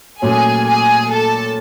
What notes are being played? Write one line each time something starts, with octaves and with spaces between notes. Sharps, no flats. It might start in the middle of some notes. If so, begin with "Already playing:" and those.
A#2 F#3 A3 C#4 G#4 G#5
G#4 G#5
A4 A5